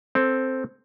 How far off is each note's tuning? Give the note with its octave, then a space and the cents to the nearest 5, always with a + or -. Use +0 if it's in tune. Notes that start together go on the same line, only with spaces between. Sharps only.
C4 +0 A4 +0